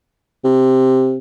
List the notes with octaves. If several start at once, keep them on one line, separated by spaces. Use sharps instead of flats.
C3